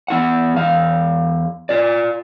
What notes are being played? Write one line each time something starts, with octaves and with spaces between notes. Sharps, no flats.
B3 E4 F#5
E2 F5
F4 D5